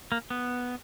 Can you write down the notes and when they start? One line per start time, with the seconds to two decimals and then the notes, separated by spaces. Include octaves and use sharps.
0.12 A#3
0.30 B3